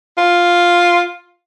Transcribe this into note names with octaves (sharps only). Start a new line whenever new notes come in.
F4